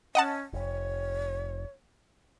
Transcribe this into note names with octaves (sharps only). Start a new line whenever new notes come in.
C#4 D#5 F#5 A5
F1 C#5